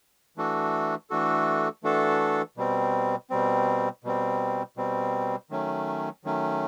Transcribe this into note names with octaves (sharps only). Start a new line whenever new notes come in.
E3 A3 D4 F#4 A4
E3 A3 D4 F#4 A4
E3 A3 D4 F#4 A4
B2 G3 C4
B2 G3 C4
B2 G3 C4
B2 G3 C4
D#3 F#3 A3 C#4
D#3 F#3 A3 C#4